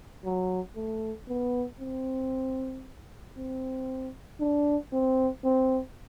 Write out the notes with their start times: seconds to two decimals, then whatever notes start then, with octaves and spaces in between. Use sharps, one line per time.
0.24 F#3
0.76 A3
1.28 B3
1.80 C4
3.37 C4
4.40 D4
4.92 C4
5.44 C4